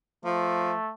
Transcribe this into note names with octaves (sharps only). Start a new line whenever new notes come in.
F3 A3